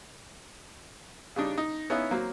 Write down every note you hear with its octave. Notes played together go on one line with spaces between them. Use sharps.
C#3 G3 D4 D#4
D#4
B3 C#4 D#4 E4 B4 F5
F#3 A#3 C4